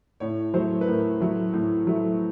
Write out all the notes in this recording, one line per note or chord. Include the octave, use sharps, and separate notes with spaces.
A2 C#5
F#3 A3 C5
B4
A2 A#4
F#3 A3
A2
F#3 A3